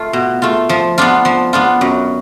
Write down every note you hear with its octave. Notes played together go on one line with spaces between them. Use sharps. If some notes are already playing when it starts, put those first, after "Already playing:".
Already playing: A3 F4
B2
A3 F4
F3
B3 D4 F4
F3
B3 D4 F4
F#2